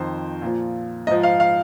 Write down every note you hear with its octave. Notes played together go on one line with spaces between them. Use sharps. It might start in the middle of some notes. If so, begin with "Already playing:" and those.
Already playing: F2 D#3 C5
A#2 F3
G#2 F3 D#5
F5
F5